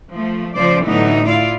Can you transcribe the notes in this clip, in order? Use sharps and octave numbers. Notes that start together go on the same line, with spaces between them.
F3 A3
C#3 F3 C5 D5
A2 D3 E3 F#3 B3 D#4
E4 F4 D5 F5